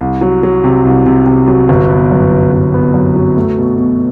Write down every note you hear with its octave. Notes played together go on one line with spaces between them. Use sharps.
C2
F#3
F#3
C3
C2
C3
C3
F#3
G1
B3
F#2
F#3
G1
B3
F#2
F#3
A3
B2
B2